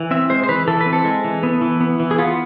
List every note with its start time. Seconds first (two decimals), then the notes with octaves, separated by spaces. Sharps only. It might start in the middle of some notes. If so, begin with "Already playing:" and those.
Already playing: E3
0.11 C4 E5
0.30 G#3 C5
0.43 C5
0.49 E3 B4
0.68 E3 A4
0.81 B4
0.86 C4
0.93 A4
1.05 G#3
1.24 E3
1.43 B3
1.62 E3
1.80 B3
2.00 E3
2.11 G#4
2.18 B3 F4